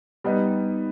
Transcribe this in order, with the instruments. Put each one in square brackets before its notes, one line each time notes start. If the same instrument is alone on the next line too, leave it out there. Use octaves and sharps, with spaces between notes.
[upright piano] G3 B3 D#4